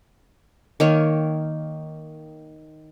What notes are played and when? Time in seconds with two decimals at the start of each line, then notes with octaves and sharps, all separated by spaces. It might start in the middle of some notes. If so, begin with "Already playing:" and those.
0.80 D#3 A#3 C#5